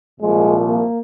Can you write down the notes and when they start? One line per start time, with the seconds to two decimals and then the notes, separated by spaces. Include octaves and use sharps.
0.19 C2 A#2 F3 G#3
0.65 A#3